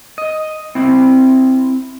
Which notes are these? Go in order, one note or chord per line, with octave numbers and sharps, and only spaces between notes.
D#5
C4 E4